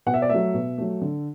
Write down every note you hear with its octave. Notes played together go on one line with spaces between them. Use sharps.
B2 F#5
E5
D5
F#3 A3 E5
B2
F#3 A3
D3